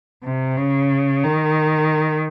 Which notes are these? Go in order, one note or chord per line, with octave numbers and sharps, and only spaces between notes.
C3
C#3
D#3